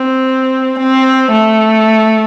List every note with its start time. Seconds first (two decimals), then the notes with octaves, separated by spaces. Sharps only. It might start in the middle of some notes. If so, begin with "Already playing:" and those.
Already playing: C4
0.78 C4
1.31 A3